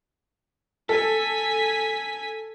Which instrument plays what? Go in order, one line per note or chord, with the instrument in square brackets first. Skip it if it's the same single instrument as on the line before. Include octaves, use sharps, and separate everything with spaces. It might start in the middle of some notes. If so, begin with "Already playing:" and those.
[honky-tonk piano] A4 [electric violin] G#5 B6